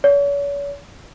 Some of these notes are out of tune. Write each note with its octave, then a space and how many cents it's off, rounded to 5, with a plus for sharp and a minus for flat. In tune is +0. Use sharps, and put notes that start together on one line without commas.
C#5 +40